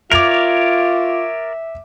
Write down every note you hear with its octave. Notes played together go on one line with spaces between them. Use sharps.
F4 A#4 C#5 D5 E5 D6 F7